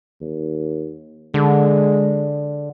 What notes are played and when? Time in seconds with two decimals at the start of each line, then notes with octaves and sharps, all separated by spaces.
0.21 D#2
1.34 D3 G#3